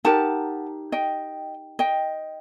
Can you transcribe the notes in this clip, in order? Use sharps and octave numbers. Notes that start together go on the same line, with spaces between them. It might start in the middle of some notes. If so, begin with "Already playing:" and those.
D#4 G4 A#4 F#5 A5
D#5 G5
D#5 G5